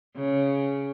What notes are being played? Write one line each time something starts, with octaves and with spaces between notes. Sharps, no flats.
C#3